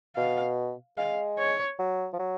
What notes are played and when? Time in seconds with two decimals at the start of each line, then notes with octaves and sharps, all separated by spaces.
0.16 B2 F5
0.98 G#3 F5
1.38 C#5
1.79 F#3
2.13 F3
2.19 F#3